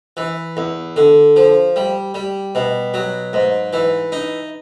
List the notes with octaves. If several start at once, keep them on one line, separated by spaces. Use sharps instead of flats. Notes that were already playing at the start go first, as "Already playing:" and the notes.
E3
E2
D3
F3
G3
G3
B2
F#3
G#2
E3
D#4